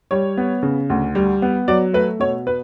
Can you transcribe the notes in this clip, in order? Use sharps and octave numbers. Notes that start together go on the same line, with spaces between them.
G3 C#5
B3
C#3
D2
G3
B3
F#3 D5
A3 B4
B2 C#5
B4